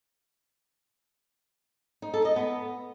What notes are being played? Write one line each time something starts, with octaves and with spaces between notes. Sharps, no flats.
D#4
A4
D#5
B3